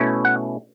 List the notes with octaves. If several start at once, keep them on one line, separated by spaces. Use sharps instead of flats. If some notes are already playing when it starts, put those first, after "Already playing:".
Already playing: B2 A3 C#4 E4
F#5